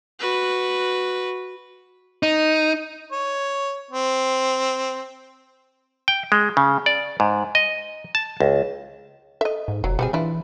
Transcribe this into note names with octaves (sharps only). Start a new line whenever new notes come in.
F#4 B4
D#4
C#5
C4
G5
G#3
C#3
D5
G#2
D#5
A5
C#2
A4 D#5 E5
G#2
F1 F#3
B2 G3 C4 G#4
E3 D4 E4 F4